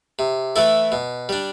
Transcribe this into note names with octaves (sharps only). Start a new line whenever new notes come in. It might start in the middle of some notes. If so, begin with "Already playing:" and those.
C3
E3 A3 E4 A4
B2
G3 D4